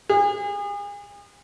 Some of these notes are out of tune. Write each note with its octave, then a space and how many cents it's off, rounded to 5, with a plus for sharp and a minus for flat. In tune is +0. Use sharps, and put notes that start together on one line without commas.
G#4 -35